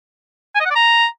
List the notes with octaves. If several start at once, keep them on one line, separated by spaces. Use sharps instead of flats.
G#5
D#5
F#5
D5
A#5